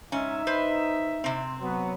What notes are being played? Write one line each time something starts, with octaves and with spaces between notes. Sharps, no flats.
G#2 C#4 D#4 E5
B4 C5
C3 C4
F#3 B3